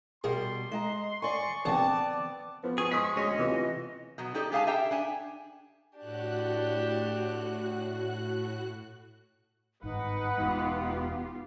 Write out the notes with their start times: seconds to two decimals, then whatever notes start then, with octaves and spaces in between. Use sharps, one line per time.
0.24 B2 G3 G#4 A#4 C6
0.71 G#3 D#5 A#5
1.22 D5 G#5 C#6
1.65 A#1 D3 B3 C4 D5 F#5 A5
2.64 F3 B3
2.78 B3 G#4 G#5 C#6
2.91 G#3 C6 D#6 B6
3.16 D2 G#3 C#4 D#5
3.39 C3 E3 F4
4.18 B2 F#3
4.34 D#4 G4 A4 D5
4.52 G#3 G4 G#4 F5 G#5 A5
4.67 G4 A4 E5 G5 A#5
4.91 D4 G#5
5.97 A2 D4 F#4 G4 F#6
9.83 G1 G#2 D#4 B4 F#5
10.38 E1 E2 G#3 B3 F4 G4